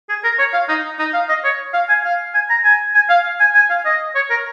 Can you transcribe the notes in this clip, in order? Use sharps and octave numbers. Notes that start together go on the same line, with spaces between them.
G#4
A#4
C#5
F5
D#4
D#4
F5
D#5
C#5
F5
G#5
F5
G#5
A#5
G#5
G#5
F5
G#5
G#5
F5
D#5
C#5
A#4